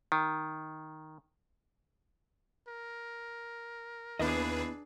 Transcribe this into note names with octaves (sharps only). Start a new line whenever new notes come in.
D#3
A#4
D#2 B3 D4 E4 G#4 B4 D#5